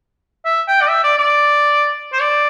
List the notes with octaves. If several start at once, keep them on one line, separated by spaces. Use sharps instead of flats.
E5
G5
D5
E5
D5
D5
C5
D5